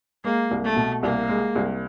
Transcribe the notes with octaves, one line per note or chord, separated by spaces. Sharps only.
G#3 A#3
C2
A3
B2
C2 A#3
G#3
C2